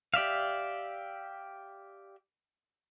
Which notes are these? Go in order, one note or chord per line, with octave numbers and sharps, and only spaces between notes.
G4 D5 E5 F5